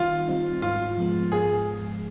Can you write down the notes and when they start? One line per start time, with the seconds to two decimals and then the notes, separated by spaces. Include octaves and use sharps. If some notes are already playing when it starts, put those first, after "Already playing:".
Already playing: D#3 G3 C4 D#4 F4
0.28 G3 C4 D#4
0.62 G#2 F4
0.98 F3 G#3 B3
1.32 G#2 G#4